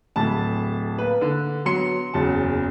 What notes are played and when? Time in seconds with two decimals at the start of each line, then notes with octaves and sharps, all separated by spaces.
0.16 D1 A3 A5 B5
0.98 A#3 B4
1.21 D3
1.65 F#3 B3 C6 C#7
2.14 F#1 E2 F#3 A5